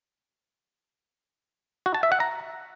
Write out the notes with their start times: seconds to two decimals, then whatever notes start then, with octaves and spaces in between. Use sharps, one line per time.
1.86 F#4
1.94 A5
2.03 E5
2.12 F#5
2.20 A#5